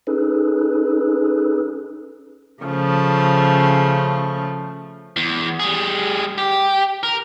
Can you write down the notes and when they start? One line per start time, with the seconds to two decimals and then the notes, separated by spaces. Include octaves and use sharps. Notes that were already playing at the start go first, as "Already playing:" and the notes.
0.07 C#4 D#4 G#4 A4 B4
2.64 C#3 F3 A3
5.16 E2
5.60 G3 G#4
6.38 G4
7.03 A#4